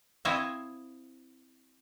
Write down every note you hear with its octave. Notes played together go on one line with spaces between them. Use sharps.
C4 E4 C5 C#5 D#5 F5